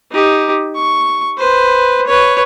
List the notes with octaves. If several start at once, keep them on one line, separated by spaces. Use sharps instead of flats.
D#4 G4
C#6
B4 C5
B4 C#5